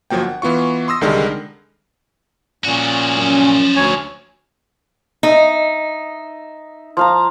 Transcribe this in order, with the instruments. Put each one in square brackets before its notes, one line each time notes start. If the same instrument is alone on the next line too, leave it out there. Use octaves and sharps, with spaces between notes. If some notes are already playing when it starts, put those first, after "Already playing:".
[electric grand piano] G1 F3 F#3 A#3 G5
F#5
E3 B3 F4 C#6
C6 D#6 E6 A#6
C2 D3 D#3 G3 G#3
[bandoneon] A#2 [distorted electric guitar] F3 F#4 [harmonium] C#4
[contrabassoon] F#2
[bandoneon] D2 C#5 G#5
[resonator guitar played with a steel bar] D#4 [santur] D#5 E5
[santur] F3 F5 A#5